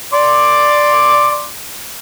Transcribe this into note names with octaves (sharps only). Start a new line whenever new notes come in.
D5 C6 D6